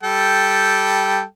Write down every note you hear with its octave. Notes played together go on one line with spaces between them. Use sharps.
G3 A4 G5